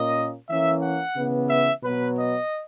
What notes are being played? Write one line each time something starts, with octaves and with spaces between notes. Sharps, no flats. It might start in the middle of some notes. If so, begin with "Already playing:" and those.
Already playing: A#2 A#3 C#4 D#5
E3 A#3 C#4 E5
F#5
C#3 E3 B3
E5
B2 F#3 B3 B4
D#5